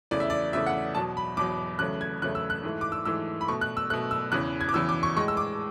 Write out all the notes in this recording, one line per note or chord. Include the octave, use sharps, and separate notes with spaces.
E2 C#3 E3 A3 D5
E5
D5
E2 C#3 E3 A3 E5
F#5
E2 B2 F#3 A5
B5
E2 B2 F#3 D6
E2 C#3 F#3 A3 F#6
G#6
E2 C#3 F#3 A3 F#6
E6
F#6
G#2 E3 A3
D6
E6
G#2 E3 A3 E6
B5
B2 A3 C#6
F#6
E6
B2 A3 F#6
E6
E2 C#3 E3 F#6
G#6
D6
E2 C#3 E3 E6
D6
C#6
A2 G#3 C#6
E6
D6